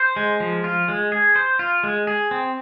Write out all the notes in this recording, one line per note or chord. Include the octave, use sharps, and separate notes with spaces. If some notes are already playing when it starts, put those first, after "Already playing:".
Already playing: C5
G#3
F3
F4
G#3
G#4
C5
F4
G#3
G#4
C4